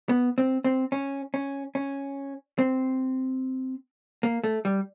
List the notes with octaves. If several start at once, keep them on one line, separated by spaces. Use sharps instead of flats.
B3
C4
C4
C#4
C#4
C#4
C4
A#3
A3
G3